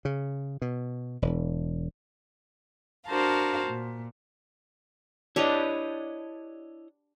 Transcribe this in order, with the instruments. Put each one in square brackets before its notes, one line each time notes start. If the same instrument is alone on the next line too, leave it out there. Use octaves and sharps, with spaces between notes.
[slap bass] C#3
B2
E1
[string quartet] D4 F#4 A#4 C5 F5 A5
A#2
[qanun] D4 G4 B4 [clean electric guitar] E4 C#5 D#5